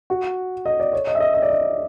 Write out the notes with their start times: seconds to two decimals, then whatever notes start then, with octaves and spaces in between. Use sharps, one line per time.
0.10 F#4
0.66 D#5
0.80 D5
0.93 C#5
1.07 D#5
1.15 E5
1.20 D#5
1.34 D#5
1.42 D5
1.50 D#5